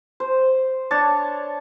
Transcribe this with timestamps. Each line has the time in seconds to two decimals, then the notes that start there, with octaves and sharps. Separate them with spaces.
0.20 C5
0.91 D4 C#5 A5